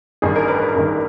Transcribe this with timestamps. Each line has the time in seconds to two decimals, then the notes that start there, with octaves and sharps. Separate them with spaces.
0.22 A1 G2 D#3 G#4
0.36 A#4
0.48 B4
0.62 B4
0.75 A1 G2 D#3 A#4